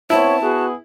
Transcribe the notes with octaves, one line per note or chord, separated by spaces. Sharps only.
B3 C4 E4 C#5 A5
B3 F#4 G#4